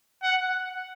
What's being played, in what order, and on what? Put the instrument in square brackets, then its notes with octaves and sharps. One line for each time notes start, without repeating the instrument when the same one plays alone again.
[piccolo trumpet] F#5